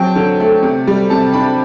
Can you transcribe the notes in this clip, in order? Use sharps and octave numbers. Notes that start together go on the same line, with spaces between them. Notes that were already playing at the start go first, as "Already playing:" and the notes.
Already playing: F#3 C4 G5 A5
D3
A3
C3
G3
C3 A5
D4 B5